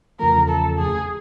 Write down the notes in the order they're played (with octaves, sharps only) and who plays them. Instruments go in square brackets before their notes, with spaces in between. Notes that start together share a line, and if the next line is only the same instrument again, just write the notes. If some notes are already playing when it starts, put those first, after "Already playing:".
[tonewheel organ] E2 C#3 F3 A3 [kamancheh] A#4
[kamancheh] A4
G#4